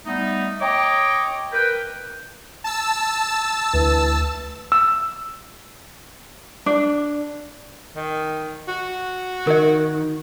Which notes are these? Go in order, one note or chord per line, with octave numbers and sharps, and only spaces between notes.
G3 A3 B3 D#4
C#5 D#5 G5 A#5 D6
A#4 B4 G5
A5 E6
D2 E3
E6
D4
D#3
F#4
D#3 A#4 D#5